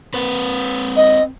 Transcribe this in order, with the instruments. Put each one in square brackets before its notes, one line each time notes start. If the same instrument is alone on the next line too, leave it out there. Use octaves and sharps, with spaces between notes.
[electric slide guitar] C4 B4
[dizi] D#5